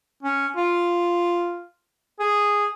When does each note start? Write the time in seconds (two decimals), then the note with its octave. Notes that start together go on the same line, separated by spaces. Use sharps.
0.23 C#4
0.56 F4
2.20 G#4